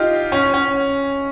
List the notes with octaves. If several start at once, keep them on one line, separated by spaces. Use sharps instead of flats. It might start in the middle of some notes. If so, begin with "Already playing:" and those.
Already playing: D#4 F4 G4
C#4
C#4